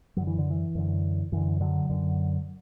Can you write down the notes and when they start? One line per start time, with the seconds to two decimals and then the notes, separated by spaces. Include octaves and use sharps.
0.17 F#2 D3 F#3
0.27 E3
0.38 D3
0.50 E3
0.75 F#2 D3
1.32 F#2 D3 E3
1.61 D3 F#3
1.90 F#2 D3